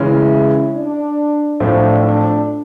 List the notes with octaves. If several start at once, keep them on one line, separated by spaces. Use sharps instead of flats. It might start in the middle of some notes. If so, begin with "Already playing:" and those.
Already playing: C#3 E3 G#3 C#4 E4
D4
A2 F3 A3 C4 D4
D4